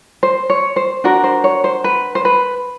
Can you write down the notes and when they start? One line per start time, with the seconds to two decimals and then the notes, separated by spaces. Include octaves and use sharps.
0.23 C5
0.50 C#5
0.76 C5
1.04 D4 F#4 A#4
1.24 C5
1.44 C#5
1.64 C5
1.84 B4
2.15 C5
2.25 B4